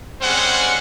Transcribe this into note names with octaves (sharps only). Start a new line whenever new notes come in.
G3 G#3 C4 C#4 C5 F#5